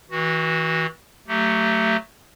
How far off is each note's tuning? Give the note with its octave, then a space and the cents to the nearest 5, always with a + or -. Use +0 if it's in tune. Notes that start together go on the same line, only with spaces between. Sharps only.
E3 -30 F#4 +0
F#3 +5 A3 +15 G4 -15